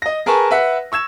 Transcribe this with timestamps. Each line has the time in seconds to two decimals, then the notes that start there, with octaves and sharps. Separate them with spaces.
0.02 D#5 A#6
0.26 G#4 A#4 B4 G#5 A5 C#6
0.51 B4 E5 F#5
0.92 C#6 E6 G#6 E7